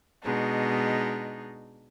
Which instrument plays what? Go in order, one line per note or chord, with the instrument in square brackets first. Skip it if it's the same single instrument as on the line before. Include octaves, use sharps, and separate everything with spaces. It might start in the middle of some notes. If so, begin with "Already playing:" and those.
[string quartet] B2 G#3 D4 D#4